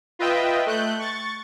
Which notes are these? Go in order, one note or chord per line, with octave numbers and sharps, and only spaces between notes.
F4 B4 D#5 E5 G5
A3 F#6 G6
C#6 A6